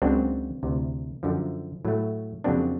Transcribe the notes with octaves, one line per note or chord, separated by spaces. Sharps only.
C#2 C#3 F#3 A#3 C4 D4
D2 C3 E3
F#2 D3 F3
A2 F#3 A3
F2 C#3 F#3 A#3 C4 D4